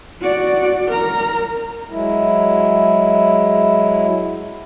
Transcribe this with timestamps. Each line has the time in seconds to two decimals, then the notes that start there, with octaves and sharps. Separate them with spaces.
0.22 F#4 D5
0.88 A#4 A#5
1.91 F#3 G#3 E4